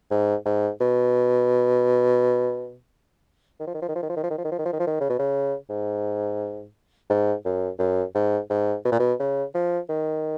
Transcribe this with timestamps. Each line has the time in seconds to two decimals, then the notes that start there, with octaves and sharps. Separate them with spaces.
0.11 G#2
0.46 G#2
0.81 B2
3.60 D#3
3.67 F3
3.75 D#3
3.82 F3
3.88 D#3
3.96 F3
4.03 D#3
4.09 F3
4.17 D#3
4.24 F3
4.31 D#3
4.38 F3
4.45 D#3
4.52 F3
4.59 D#3
4.66 F3
4.73 D#3
4.80 F3
4.87 D#3
5.00 C#3
5.10 B2
5.19 C#3
5.70 G#2
7.10 G#2
7.45 F#2
7.79 F#2
8.15 G#2
8.50 G#2
8.85 B2
8.92 A#2
9.00 B2
9.20 C#3
9.55 F3
9.89 D#3